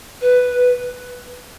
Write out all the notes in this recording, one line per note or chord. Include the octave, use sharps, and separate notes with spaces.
B4